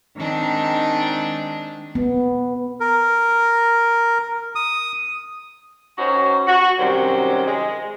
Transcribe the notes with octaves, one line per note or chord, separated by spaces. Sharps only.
D#3 G#3 C4 D4 D#4
B3
A#4
D#6
D#3 C#4 D#4 F#4 C5 C#5
F#4
F#2 C3 D#3 F#3 G3 C5
G#3